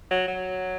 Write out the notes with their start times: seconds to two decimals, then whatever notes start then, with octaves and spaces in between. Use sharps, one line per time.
0.11 F#3
0.28 F#3